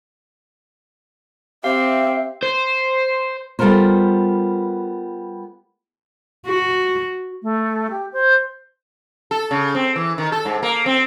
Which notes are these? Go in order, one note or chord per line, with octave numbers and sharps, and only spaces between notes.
C4 G4 E5 F5
C5
G3 B3 F4 A4 A#4 C5
F#4
A3
G4
C5
A4
C#3
C4
E3
D#3
A4
G#2
A#3
C4